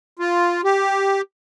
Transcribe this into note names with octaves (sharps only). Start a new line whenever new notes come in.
F4
G4